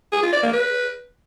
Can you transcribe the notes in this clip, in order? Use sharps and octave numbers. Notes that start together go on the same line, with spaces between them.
G#4
F4
D5
A#3
B4